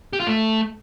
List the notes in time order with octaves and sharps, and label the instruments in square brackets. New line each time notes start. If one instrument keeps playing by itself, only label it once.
[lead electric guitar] G4
F4
A3